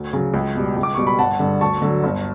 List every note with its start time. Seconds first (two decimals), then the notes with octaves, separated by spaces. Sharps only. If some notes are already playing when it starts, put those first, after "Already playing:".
Already playing: D2
0.13 C#3 F#3
0.34 C#2
0.55 B2 G3
0.76 C#2
0.83 D6
0.95 B2 G3 C#6
1.07 B5
1.19 G1 F#5 A5
1.39 G2 D3
1.61 D2 A5 C#6
1.82 D3 F#3
2.03 G1